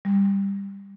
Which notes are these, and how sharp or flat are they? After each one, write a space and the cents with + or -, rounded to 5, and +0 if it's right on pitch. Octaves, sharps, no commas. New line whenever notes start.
G3 +15